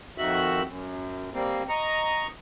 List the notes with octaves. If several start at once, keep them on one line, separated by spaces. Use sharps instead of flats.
F2 D#3 F#4 E5 F#6
F#2
G3 A#3 C4
D#5 A#5 C#6